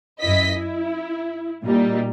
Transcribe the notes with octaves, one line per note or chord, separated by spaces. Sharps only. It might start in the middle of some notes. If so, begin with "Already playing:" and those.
F#2 E4 D#5 B6
E4
A#2 G3 D#4